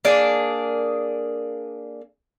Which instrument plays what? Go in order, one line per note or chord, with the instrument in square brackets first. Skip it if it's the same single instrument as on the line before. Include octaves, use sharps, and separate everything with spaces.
[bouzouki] A#3 D4 G#4